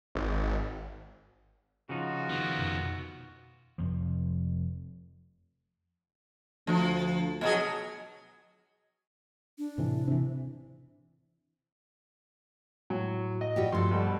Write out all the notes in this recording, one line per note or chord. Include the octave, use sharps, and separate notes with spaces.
G#1
C#3 F3 D#4 F4 F#4
D#3 B3 C#4
F2 B2
F1 F2 F3
D2 F3
B2 F#3 G#4
D4
A2 C3 E3
C3 E3
A2 F#3
D#5
G3 F#4 G4
G2 F3 A3 A4 C6
B2 G3